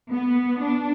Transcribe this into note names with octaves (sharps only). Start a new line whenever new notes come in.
B3
D4